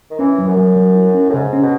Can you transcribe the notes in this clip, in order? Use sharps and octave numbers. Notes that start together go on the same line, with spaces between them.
D#3
E3 C#4
F#3
F#2
F#3
F#3
E4
C#4
A2
G#2 C#3
C#4
B2